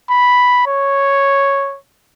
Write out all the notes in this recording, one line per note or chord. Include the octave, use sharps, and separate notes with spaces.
B5
C#5